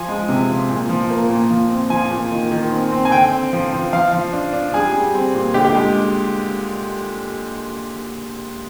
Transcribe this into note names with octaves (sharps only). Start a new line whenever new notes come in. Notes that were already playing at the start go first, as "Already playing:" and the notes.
Already playing: F3 G#5
G#3
C3
F3
A#2
F3
A#3
A#2
F3
C4
F3 G#5
A#2
D#3
D#3
C4
C4
G#5
D3 G5
C4
F3
F3
F3 F5
F3
D4
D4
G3 G#4
G3
C4
A#2
D3 G4
G4
G#3